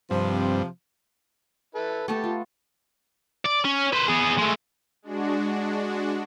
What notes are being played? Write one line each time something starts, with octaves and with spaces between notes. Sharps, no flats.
G2 C3 F3 C4
E4 A4 B4
A3 B3 G4 A4 A5
F4
D5
C#4
B4 C5
B3 G#4
G#3 A3
G#3 D4 F#4